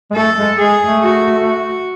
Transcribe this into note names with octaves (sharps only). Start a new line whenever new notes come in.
G#3
A3 A4
G#3
G#3 G#4
A3
F#4
F#4